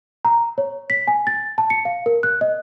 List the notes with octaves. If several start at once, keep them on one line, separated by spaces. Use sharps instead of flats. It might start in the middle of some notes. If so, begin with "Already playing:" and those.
A#5
C#5
B6
G#5
A6
A5
C#7
F5
A#4
F#6
D#5